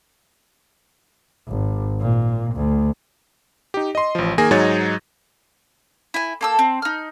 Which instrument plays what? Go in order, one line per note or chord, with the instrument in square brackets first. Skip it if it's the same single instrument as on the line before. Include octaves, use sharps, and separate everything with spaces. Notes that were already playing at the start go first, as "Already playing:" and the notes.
[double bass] G#1
A#2
D2
[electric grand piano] D#4 G4
D#5 C6
A1 F3
D#3 A#3 G#4 G#5 G#6 A#6
G#2 F#3 D#4 G#4 C#5 A6
[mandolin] E4 G#5
A#3 A4 E6
C4
D#4 F6